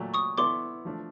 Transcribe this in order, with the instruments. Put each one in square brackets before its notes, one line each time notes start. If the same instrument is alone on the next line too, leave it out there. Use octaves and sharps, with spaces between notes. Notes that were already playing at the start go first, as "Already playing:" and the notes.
Already playing: [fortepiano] A#2 F#3 A3
[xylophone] C#6 D#6
[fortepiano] B3 E4 A4 D5 [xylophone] C6 D6
[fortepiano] F3 A3 D4